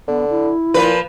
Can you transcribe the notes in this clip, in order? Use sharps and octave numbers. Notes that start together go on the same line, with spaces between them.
D3 B3
E4
A#2 F3 B4